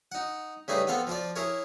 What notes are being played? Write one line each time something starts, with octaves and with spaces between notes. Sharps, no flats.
D#4 F#5
C#3 G3 A3 D#4 G#4 B4
B3 C4 A4 F5 B5
F3 F4 D5
E4 G#4 A#4 C#5